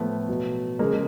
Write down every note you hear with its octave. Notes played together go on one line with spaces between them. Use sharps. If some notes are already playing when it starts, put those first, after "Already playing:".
Already playing: A2 F3 A3 B3
B2 F#3
C#3 F3 G#3 A#3
G#3